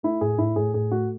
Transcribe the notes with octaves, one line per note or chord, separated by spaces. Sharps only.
A3 E4
A2 G#4
A2 E4
A2 G#4
A2 G#4
A3 F#4